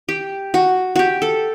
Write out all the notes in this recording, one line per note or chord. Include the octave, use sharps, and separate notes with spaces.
G4
F#4
F#4 G4
A4